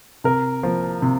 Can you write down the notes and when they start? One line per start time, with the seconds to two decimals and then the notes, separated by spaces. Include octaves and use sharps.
0.24 C3 A#4
0.63 F3 A#3
1.02 C3